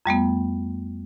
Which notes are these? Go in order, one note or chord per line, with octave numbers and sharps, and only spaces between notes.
F2 G3 A3 B3